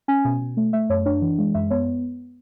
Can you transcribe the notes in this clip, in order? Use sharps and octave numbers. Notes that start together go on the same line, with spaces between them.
C#4 G#5
B2
B2
A3
A3 E5
F#2 C#5
D4 C#5
E3
G#3
F#2 E5
B3 C#5